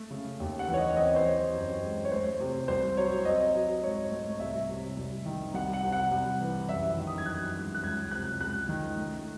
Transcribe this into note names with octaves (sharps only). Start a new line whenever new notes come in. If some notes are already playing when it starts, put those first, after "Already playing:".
Already playing: A3
C#3
D#2
F#5
E3
C#5
D#5
C4 D#5
C#5
C5
E3 C#5
F#2
G#3
C#5
A3 C5
C3
C2 C5
F#3 C#5
C4 D#5
F#3
G#2 C#5
A3
C2 E5
C3
C2
D#3
C2 F#5
F#5
C3
F#5
C2
E3
F#2 E5
D#3
D#6
G#6
F#2 F#6
G#3
F#6
C#2 G#6
C3 F#6
C#2 F#6
D#3
A3